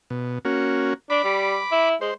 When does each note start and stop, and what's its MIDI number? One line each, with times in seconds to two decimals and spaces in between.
0.10 0.39 47
0.45 0.94 58
0.45 0.94 61
0.45 0.94 66
1.10 1.19 62
1.10 1.89 83
1.10 1.89 86
1.24 1.58 55
1.72 1.95 64
2.01 2.11 56
2.01 2.14 72